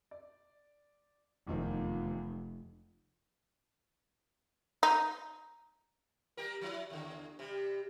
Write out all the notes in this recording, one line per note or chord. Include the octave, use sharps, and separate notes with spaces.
D5
F1 E2 D#3 F3
D#4
G3 G4 A#4
F3 F#3 E4
D#2 D3
C3 G3